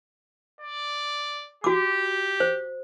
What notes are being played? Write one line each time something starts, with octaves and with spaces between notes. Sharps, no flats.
D5
F#4 G4 D6
C5